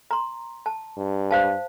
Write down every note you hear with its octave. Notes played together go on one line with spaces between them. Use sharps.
A#5 C6
A5
G2
C5 F5 A5